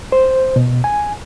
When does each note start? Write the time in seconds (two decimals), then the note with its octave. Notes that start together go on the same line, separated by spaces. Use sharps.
0.12 C5
0.56 B2
0.84 G#5